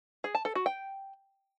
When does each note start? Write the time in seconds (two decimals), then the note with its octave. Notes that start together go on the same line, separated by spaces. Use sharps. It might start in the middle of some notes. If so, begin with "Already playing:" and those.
0.24 G#4
0.35 A5
0.45 A4
0.55 F#4
0.66 G5